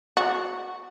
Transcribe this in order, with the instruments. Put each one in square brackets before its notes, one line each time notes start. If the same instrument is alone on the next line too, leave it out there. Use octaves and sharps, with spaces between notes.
[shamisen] F#4